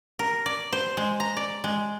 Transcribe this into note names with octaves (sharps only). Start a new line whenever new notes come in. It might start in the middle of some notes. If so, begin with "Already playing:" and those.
A#4
D5
C5
G#3
A#5
D5
G#3